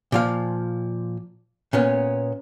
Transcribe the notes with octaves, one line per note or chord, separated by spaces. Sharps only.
A#2 F3 F5
A#2 B3 C#4